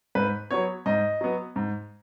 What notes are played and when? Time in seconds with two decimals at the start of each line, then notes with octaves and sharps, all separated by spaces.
0.15 G#2 B4
0.51 F#3 B3 C#5
0.86 G#2 D#5
1.21 F#3 B3
1.56 G#2